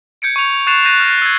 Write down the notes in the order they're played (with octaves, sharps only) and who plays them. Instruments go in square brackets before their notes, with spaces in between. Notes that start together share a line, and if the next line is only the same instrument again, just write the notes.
[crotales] G6 G#6 C#7 D7
C#6 C#7 F7
C#6 F#6 A6 C7 E7 F7
F#6 G6 A6 A#6 D#7
F6 F#6 A6 C7
E6 G#6